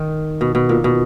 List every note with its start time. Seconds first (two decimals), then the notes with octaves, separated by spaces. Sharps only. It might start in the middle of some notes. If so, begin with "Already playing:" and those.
Already playing: D#3
0.41 B2
0.55 B2
0.69 A#2
0.84 B2